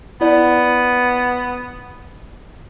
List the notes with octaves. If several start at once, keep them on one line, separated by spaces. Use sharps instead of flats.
B3 E4 D5